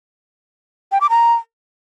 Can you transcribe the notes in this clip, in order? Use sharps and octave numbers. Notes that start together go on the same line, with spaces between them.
G5
D6
A#5